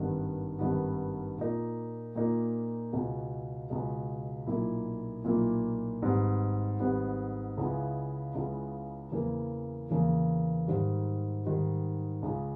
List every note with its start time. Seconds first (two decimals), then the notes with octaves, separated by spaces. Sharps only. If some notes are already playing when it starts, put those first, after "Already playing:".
Already playing: G#1 G2 D#3 G3 B3
0.59 G#1 G2 D#3 G3 B3
1.38 A#2 A#3 D#4
2.15 A#2 A#3 D#4
2.92 C#2 B2 G#3
3.70 C#2 B2 G#3
4.47 B1 A#2 A#3 E4
5.24 B1 A#2 A#3 E4
6.02 G#1 G#2 G3 B3
6.79 G#1 G#2 G3 B3
7.57 C#2 C#3 G#3 B3 E4
8.35 C#2 C#3 G#3 B3 E4
9.12 E2 C#3 E3 A#3
9.90 E2 C#3 E3 A#3
10.67 G#2 D#3 G3
11.45 G#2 D#3 G3
12.22 C#2 C#3 G#3